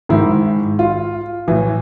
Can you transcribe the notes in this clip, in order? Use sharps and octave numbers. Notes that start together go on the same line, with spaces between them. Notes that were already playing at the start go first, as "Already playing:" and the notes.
G#2 D#3 E4
F4
A2 E3